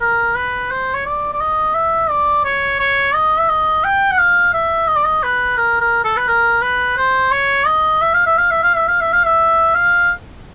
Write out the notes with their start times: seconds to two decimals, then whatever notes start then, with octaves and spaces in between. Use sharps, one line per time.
0.01 A#4
0.35 B4
0.71 C5
0.94 C#5
1.06 D5
1.33 D5
1.40 D#5
1.74 E5
2.10 D5
2.44 C#5
2.79 C#5
3.14 D#5
3.38 E5
3.49 D#5
3.84 G5
4.11 F#5
4.18 F5
4.53 E5
4.87 D#5
4.96 D5
5.04 D#5
5.23 B4
5.57 A#4
5.80 A#4
6.04 A4
6.16 B4
6.27 A#4
6.61 B4
6.97 C5
7.32 C#5
7.66 D#5
8.01 E5
8.13 F5
8.26 E5
8.37 F5
8.50 E5
8.63 F5
8.76 E5
8.88 F5
9.01 E5
9.12 F5
9.25 E5
9.74 F5